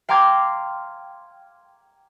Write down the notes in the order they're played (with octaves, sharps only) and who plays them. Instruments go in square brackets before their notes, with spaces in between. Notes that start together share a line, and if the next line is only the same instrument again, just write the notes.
[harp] F5 G5 A#5 C6 D6 G#6